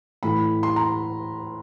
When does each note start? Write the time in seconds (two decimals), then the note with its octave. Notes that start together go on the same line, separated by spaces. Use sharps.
0.23 A2 E3 A3 B5
0.63 C6
0.76 A#5